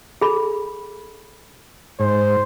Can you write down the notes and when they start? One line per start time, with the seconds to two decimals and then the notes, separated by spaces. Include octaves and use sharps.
0.21 G#4 A4 B5
2.00 G#2 C5